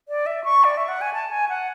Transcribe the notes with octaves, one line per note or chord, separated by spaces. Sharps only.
D5
E5
C#6
D5
E5
F#5
G#5
A5
G#5
F#5